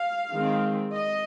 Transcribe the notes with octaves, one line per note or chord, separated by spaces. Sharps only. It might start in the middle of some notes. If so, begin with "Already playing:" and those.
Already playing: F5
D#3 G#3 C4
D#5